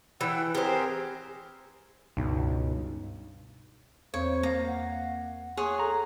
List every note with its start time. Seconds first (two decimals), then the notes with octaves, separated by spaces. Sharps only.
0.21 E3 F#5 G5 E6
0.55 C4 G4 G#4 A#4 C5
2.17 C#2 G2 B2 D#4
4.14 E2 C4 C5 C#5
4.43 A#3 F5 A#5
4.67 F#5
5.57 G#4 C#5 F#5 C6
5.80 A4 A#5